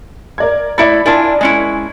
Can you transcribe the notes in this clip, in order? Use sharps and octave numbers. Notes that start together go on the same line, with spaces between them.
A#4 D5 G#6
A3 E4 D5 E5 B5
D4 E4 F4 A#4 G#5
G#3 C#4 E4